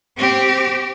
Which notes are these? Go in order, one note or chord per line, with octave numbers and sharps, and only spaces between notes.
C4 G4